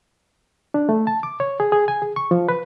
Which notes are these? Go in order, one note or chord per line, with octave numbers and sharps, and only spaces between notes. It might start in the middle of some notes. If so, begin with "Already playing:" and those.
D4
A3
A5
D6
C#5
G#4
G#4
G#5
G#4
C#6
F3
B4